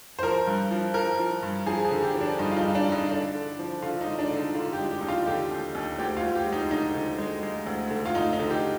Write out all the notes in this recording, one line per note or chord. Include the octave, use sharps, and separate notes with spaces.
C5
F3 A#4
G2
F3
F3 A#4
F3
G2
F3 G#4
G#4
D3
G4
F3
D4
G2 D#4
F4
D#4
G2
D4
G2
D#4
D3 D4
D3
F3
D3 F4
D#4
G#3
D4
D3
D#4
D3 F4
G4
G#3
G4
D#2 D#4
F4
D3 G4
D#2
D#2
D2 G4
F4
D2
G4
G#3
D#4
D3 D#4
D3
G#3
G#3
D2
D3
F4
D2 D#4
D#4
D3
G4